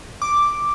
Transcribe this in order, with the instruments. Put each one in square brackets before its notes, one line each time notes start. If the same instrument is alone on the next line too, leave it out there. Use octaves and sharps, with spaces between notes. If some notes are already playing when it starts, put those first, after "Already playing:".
[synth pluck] D6